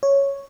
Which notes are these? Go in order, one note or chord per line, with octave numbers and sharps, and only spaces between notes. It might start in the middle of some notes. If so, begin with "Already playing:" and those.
C#5